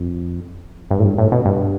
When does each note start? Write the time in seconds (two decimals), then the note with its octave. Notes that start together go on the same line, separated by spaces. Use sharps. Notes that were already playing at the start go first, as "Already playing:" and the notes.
Already playing: F2
0.91 G2
0.99 A2
1.05 G2
1.18 A2
1.32 B2
1.46 G2